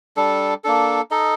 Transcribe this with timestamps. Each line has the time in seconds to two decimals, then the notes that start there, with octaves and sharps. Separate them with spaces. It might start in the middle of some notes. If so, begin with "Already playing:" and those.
0.17 G3 D4 A4
0.64 A#3 D4 A4
1.11 D#4 A4 D#5